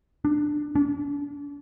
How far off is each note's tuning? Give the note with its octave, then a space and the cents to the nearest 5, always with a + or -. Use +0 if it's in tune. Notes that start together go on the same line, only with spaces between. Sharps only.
D4 +15
D4 -40